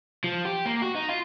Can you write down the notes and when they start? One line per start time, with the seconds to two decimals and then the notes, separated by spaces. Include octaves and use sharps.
0.24 F3
0.45 G4
0.65 A#3
0.82 F#4
0.95 D#4
1.09 F4